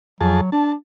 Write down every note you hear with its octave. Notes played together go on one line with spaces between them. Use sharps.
F2 F#3 G#4 A5
D4 A5